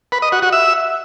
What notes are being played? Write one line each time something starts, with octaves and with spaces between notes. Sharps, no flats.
B4
D#5
F#4
F#4
E5